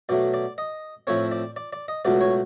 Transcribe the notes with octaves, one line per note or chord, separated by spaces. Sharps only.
B2 F#3 A3 D5
D5
D#5
A2 F3 A3 C4 C#5
D5
D5
D5
D#5
C#2 B2 F#3 A3 D5
C#5